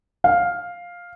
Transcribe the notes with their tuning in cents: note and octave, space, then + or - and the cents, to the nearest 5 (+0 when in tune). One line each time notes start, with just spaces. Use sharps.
F5 +5